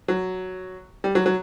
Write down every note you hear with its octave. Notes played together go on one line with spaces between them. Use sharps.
F#3
G3
F#3
F#3